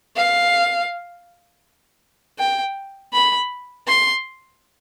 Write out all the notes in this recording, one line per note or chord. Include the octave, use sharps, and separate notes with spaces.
F5
G5
B5
C6